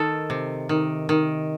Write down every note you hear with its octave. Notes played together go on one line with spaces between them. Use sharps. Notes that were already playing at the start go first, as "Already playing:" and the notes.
Already playing: D#3 A4
C3
D#3
D#3